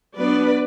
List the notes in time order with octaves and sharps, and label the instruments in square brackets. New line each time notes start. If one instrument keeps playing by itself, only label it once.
[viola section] F#3 B3 D4 B4 D5